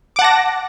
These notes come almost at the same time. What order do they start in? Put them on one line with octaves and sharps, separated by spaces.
D6 F#5 A5 A#6